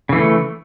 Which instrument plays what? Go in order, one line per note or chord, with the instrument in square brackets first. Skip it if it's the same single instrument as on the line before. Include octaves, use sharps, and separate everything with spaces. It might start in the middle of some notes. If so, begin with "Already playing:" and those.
[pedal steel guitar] C#3
E3
A3